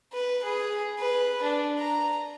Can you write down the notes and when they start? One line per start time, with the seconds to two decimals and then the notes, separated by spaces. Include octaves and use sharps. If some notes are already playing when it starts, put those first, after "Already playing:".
0.13 B4
0.43 G#4
0.99 B4
1.42 D4
1.79 A#5